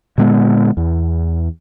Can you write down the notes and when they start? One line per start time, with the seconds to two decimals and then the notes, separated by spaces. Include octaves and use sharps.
0.18 A#2 D3 G#3 B3
0.77 E2